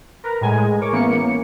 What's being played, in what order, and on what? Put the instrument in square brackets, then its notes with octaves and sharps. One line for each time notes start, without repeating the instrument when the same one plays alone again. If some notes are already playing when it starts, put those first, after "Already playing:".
[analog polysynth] A#4 B4 A#5
A2 G#3 G#5
G#3
A#4 C#5 D6
E3 A#3 B3 C#4 C#7
A#3